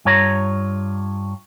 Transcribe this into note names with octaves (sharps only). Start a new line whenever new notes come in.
G2 F4 C#5 A#5